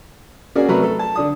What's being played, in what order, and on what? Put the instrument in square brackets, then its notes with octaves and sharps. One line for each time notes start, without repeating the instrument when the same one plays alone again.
[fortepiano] A#3 C#4 F#4 G#4 D5
C3 F#3 A3 A#4 B4
A4
A5
D3 D4 D#6